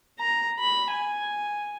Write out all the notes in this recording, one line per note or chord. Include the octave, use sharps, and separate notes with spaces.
A#5
B5
G#5